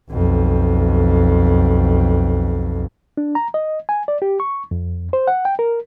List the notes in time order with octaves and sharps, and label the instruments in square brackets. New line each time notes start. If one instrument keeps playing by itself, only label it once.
[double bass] B1 F2
[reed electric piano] D4
A#5
D#5
G#5
D5
G4
C#6
F2
C5
F#5
G5
A#4